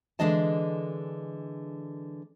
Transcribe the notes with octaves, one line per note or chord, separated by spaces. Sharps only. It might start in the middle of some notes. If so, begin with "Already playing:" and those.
D3 E3 G#3 D4 D#5 A5